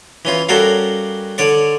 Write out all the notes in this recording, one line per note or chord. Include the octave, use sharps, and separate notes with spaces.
E3 C#4 F4
G3 C#4 F#4 A4 A#4 F5
D3 C#5 D5 C#6